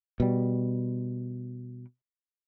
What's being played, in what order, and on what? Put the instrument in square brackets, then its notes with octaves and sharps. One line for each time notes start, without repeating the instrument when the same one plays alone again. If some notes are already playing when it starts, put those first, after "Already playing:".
[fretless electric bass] B2 G3